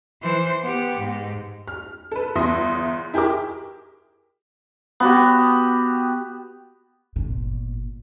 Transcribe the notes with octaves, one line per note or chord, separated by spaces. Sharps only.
E3 C5
B3 G4
G#2
F6
A4 B4
G1 E2 E5 C6 D#6 A#6
E4 G4 G#4 A#4 D6
B3 F#4 G4
G1 A#2